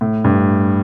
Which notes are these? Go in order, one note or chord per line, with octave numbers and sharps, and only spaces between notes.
A2
G2